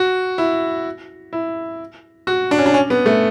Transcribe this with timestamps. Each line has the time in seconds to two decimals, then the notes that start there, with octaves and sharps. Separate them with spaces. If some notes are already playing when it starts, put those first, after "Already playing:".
Already playing: F#4
0.38 E4
1.33 E4
2.27 F#4
2.51 D4
2.59 C#4
2.66 D4
2.74 C#4
2.90 B3
3.06 A3